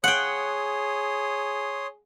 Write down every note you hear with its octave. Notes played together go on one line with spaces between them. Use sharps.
G#4 C#5 F#5 G5 C6 D#6